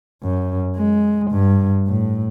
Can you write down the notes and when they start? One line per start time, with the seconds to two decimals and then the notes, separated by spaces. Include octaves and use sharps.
0.23 F#2
0.76 G#3
1.31 G2
1.87 A2